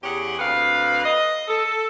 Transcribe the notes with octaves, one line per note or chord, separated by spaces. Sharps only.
E2 C#4 G4 G#4 F#5
D2 C4 B4 F5
D#5
A4